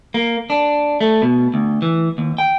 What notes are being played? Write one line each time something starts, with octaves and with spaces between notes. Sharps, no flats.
A#3
D4
A3
B2
D2
E3
D#2
G5